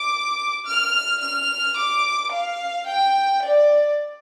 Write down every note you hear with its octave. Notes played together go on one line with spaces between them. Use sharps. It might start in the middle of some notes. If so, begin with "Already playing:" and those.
Already playing: D6
F6
F6
D6
F5
G5
D5